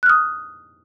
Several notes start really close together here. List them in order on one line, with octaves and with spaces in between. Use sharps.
F#6 F6 D#6